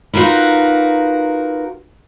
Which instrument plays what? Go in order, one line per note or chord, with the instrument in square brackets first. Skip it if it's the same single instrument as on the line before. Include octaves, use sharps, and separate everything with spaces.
[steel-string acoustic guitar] D#4 F4 F#4 A#4 B4